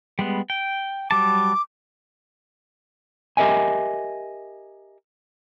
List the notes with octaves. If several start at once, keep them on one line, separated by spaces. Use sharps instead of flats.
G3 G#3 B3
G5
F#3 G3 A5 D6
G4 A#4 D#5 E5 G#5